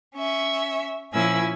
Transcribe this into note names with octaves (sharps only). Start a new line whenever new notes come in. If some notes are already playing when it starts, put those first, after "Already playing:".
C#4 E5
A#2 F3 C#4 E4 G#5 E6